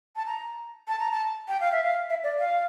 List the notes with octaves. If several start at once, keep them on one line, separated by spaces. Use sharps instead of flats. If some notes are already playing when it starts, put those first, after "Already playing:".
A5
A#5
A5
A#5
A5
G5
F5
E5
F5
E5
D5
F5